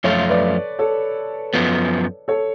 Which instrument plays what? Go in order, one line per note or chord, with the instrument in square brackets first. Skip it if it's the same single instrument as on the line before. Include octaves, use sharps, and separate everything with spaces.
[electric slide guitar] F#2 F3 A3 F4 [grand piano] A4 C#5
[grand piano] B4 D5
A4 C#5
[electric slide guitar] F#2 F3 B3
[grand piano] A4 C#5